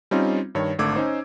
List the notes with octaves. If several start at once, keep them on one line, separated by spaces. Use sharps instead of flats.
G3 C4 C#4 D#4 F4
G2 D#3 C#5
G#1 D3 A3 D6 E6 G#6
C#4 D#4 C5